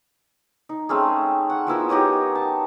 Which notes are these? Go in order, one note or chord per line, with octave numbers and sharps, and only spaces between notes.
D#4
A3 C4 C#4 G#4
F#5
F3 B3 E4 A#4
D#4 G4 C#5 D#6
A5